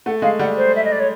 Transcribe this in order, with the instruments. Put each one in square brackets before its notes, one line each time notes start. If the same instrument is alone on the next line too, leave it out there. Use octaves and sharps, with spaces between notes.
[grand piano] A3 [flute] F#5
[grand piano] G#3 [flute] F5
[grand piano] G3 [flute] F#5
[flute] C5
E5
D#5
D5
C#5